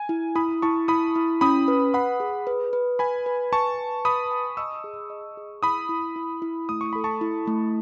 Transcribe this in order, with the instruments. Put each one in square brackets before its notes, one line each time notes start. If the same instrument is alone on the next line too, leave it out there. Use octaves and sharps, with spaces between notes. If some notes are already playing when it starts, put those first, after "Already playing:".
Already playing: [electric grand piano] G#5
[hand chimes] E4
[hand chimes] E4 [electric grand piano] B5 D#6
[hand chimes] E4 [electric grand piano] A5 C#6
[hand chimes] E4 [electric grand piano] B5 D#6
[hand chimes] E4
[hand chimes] C#4 [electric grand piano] B5 D#6
[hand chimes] B4
[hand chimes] F#5 [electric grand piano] B5 D#6
[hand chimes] G#4
B4
B4
[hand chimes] B4 [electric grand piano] G#5 B5
[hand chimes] B4
[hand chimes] G#5 [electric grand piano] A5 C#6
[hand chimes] B4
[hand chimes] B4 [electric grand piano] B5 D#6
[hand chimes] G#5
[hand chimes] D#5 [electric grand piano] C#6 E6
[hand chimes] G#4
D#5
G#4
[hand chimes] E4 [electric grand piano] B5 D#6
[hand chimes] E4
E4
E4
[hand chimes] A3 [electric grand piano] D#6
[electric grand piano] C#6
[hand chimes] A4 [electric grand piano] B5
[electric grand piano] A5 C#6
[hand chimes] E4
A3